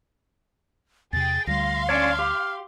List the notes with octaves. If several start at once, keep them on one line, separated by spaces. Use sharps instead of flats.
E2 C3 G#4 G5 A6
D2 G3 F5 C6 A#6
C#4 D4 C#5 F6
G4